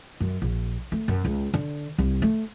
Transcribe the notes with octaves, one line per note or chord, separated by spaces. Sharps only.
F#2
A#1
A3
F#2
C#2
D3
C2
A3